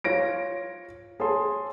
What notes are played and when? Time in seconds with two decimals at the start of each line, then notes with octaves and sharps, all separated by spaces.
0.04 F4 C#5 A#6 D7
1.20 G#4 A4 C#5 A5 C6